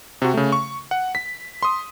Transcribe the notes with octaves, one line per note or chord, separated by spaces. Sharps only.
C3 F#4
C#3 A3
C#6
F#5
B6
C6 D#6